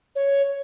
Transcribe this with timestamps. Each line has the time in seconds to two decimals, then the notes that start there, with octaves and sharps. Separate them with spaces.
0.16 C#5